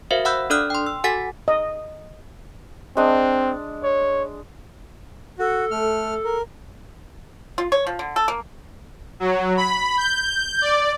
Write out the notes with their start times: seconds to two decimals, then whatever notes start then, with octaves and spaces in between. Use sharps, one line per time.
0.11 F#4 A#4 C5 E5 F5
0.25 F5 F#5 B5 E6 F#6 G6
0.50 D4 A4 D5 D#6 F6 F#6
0.70 G5 C6
0.86 E6
1.04 F#4 A4 F#5 G#5 A6 B6
1.48 D#5
2.97 G#3 C4 D4
3.83 C#5
5.39 F#4 A4
5.71 A3 F6
6.25 A#4
7.58 F4
7.72 C#5
7.87 F3
7.99 D3
8.16 A4
8.28 A#3
9.20 F#3
9.57 B5
9.97 G6
10.62 D5